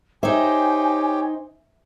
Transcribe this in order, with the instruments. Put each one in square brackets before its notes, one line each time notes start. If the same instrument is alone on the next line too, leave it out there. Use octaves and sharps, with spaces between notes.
[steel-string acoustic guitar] D#4 C5 [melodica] G4 C#5 G5 [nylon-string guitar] E5 [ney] G#5